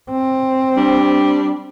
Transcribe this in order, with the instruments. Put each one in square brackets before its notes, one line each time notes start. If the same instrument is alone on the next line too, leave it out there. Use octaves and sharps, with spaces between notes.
[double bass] C4
[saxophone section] G3 D4